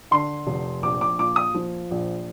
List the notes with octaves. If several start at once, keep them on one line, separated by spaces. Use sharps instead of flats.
D3 C6
F1
A#1 D6
D6
A#2 D6
D#6
F3
A#1